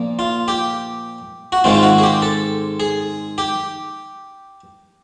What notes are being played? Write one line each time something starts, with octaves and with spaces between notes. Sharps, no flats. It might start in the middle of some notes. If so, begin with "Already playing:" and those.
Already playing: A#2 F3 A#3
F4
G4
F#4
G#2 D#3 G#3 C4 F4
F4
F#4
G#4
G4
A4
G#4
G4